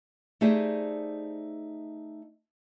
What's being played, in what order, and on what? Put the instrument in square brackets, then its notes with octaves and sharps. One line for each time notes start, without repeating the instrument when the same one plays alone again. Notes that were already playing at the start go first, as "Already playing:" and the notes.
[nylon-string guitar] A3 D#4 G4 G#4 C5 D5